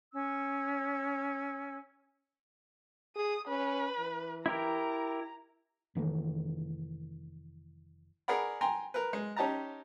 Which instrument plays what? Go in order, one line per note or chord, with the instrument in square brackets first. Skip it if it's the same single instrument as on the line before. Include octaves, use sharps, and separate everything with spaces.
[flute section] C#4 E6
[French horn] G#4 [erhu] D#6
[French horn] C#4 [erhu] B4
[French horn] E3
[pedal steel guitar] E4 G4 A#4 [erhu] A#5
[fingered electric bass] F1 D#3 E3 A3
[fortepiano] G#4 A#4 D5 F#5 B5
G5 G#5 A#5 C6
A#4 B4
G#3
C#4 D#4 G4 A5 A#5